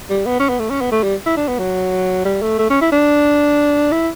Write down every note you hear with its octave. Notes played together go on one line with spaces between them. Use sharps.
G3
B3
C#4
B3
A3
C#4
B3
A3
G3
E4
D4
B3
F#3
G3
A3
A3
C#4
E4
D4
E4